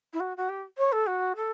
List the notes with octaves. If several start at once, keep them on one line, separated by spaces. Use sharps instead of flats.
E4
F#4
F#4
G4
C#5
A4
F#4
A4